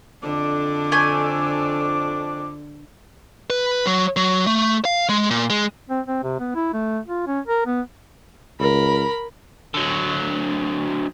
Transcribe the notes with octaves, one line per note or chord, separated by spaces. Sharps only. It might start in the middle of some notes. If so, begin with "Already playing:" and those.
F2 D3 D4 D6
A3 G#5
B4
F#3
F#3
A3
F5
G#3
A#2
G#3
C4
C4
C3
B3
E4
A3
F4
C#4
A#4
B3
C#2 A#4 B5
D3 F#3